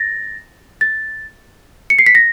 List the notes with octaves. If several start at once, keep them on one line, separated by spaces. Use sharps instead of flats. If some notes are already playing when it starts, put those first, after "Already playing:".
Already playing: A6 A#6
A6
C#7
C7
B6
A#6